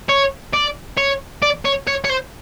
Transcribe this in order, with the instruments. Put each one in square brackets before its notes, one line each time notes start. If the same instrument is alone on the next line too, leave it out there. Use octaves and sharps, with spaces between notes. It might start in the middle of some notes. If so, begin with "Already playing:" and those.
[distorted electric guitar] C#5
D5
C#5
D5
C#5
C#5
C#5
C5